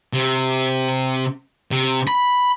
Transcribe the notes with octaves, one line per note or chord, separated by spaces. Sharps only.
C3
C3
B5